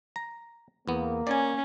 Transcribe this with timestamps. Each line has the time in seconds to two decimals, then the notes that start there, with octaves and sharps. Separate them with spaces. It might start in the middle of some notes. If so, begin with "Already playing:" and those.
0.16 A#5
0.88 E2 A#3 B3
1.27 C#4 D5 G#5